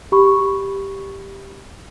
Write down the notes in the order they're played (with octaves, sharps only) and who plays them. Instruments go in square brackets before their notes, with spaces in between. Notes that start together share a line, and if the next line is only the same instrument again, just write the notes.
[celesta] G4 B5 C#6